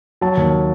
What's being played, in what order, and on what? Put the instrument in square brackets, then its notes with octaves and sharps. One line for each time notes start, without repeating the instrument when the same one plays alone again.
[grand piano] F#3 A5
D#2